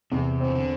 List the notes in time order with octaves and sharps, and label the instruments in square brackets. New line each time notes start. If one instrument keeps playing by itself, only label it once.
[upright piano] E2 [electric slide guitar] C3
[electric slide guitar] E3 [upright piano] C4
[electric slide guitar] D3